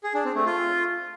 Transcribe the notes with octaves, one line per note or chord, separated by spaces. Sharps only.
G#4
D4
C4
A3
F4